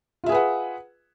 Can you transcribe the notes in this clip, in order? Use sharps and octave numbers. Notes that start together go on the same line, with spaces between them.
F4 G#4 B4 E5 F#5